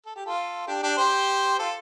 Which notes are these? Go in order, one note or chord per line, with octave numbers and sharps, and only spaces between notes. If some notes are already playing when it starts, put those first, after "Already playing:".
A4
G4
F4 A4
D4 G4
D4 G4
G4 C5
F4 A4